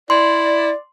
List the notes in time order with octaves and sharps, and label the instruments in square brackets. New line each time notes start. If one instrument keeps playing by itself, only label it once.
[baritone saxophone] E4 [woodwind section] D5 [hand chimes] C6